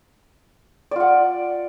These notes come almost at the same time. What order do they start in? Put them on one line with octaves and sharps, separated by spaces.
D5 F4 F#5